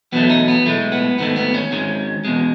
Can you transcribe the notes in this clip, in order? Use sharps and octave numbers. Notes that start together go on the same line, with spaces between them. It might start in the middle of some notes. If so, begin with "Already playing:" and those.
E2 B2 F#3 A3 B3
D#4
B3
B1 A2 G#3 A3
B3
G#2 D#3 A3 B3
B3
C#4
G#2 D#3 G#3
E2 B2 G#3